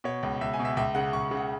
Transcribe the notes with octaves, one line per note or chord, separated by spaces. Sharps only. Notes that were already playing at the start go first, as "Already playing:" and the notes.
B2 C#5
C#2
C#2 E5
G#5
B2
E5
C#2 E5
C#3 F#5
C#2 C#6
C#3
F#5